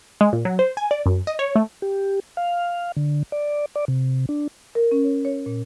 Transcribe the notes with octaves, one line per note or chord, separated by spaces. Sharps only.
G#3
A#2
F#3
C5
G#5
D5
F#2
D#5
C#5
A3
G4
F5
D3
D5
D5
C3
D4
A#4
C#4
C#5
C#5
A#2